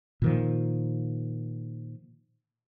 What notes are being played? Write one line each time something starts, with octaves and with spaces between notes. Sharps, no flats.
A#2 D#3 F3